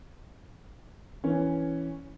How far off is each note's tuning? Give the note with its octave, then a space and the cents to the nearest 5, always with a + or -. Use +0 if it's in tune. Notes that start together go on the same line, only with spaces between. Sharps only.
E3 +0 C#4 +0